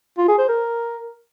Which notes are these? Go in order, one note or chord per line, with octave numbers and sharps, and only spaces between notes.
F4
G#4
C5
A#4